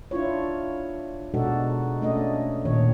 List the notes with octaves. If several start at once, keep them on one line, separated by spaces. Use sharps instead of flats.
D4 E4 F4 C#5
B2 G#3 D4 D#4 F#4 A4
A3 C#4 D4 D#5
A#2 D#3 C#5